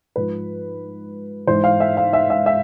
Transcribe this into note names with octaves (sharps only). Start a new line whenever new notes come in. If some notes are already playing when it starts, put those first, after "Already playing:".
G#2 F3 B4
G#2 E3 C5
F5
E5
F5
E5
E5
E5